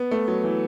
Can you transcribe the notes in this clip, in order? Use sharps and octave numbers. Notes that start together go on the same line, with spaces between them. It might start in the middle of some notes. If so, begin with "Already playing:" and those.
Already playing: B3
A3
F#3
E3